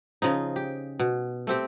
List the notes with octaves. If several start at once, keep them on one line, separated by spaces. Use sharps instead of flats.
C#3 F3 D#4
G4
B2
A3 C4 G4